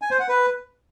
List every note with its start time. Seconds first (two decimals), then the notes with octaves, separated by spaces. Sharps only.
0.02 G#5
0.11 C5
0.20 F#5
0.28 B4